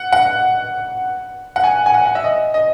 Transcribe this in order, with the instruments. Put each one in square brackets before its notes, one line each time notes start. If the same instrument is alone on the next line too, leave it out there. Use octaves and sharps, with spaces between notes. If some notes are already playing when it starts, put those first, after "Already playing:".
Already playing: [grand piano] F#5
F#5
F#5
G#5
G#5
F#5
F#5
E5
D#5
D#5